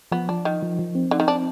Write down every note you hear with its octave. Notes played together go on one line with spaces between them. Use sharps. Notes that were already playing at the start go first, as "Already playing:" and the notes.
F3 B3
F3 D4
D#3 D#4
F3
F3
C4
D3 D#4
D#3
C4 D4